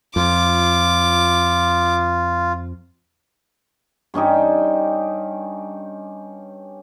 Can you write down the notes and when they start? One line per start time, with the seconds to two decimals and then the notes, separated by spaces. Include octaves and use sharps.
0.16 F2 F4 D6
4.14 G2 C#4 D#4 G4